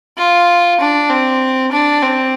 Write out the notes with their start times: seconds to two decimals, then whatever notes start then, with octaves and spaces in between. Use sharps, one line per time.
0.17 F4
0.80 D4
1.10 C4
1.72 D4
2.03 C4